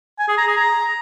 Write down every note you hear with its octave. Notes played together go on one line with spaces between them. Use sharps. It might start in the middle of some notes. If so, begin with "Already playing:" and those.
G#5
G#4
A#5
G#4
A#5